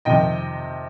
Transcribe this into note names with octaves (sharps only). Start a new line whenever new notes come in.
F2 C3 D#3 D#5 G5